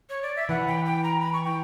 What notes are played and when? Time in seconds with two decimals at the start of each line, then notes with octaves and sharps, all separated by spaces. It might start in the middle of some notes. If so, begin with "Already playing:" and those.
0.10 C#5
0.22 D5
0.36 E5
0.49 E3 F#5
0.68 G5
0.86 G5
1.04 A#5
1.21 B5
1.33 C#6
1.45 G5